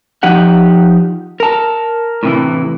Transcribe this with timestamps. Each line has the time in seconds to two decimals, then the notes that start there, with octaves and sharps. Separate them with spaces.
0.23 F3 D#4 G4 F#5
1.40 A#4 A5
2.23 A2 C3 E3